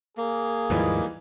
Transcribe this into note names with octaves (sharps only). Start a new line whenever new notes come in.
A#3 G#4
D#2 G#2 E3 F3 G3 D#4